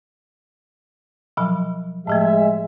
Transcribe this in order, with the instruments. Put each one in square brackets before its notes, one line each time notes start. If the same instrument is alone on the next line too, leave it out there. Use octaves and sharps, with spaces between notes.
[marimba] B2 F3 F#3
[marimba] A2 F3 A3 [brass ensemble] G#3 E5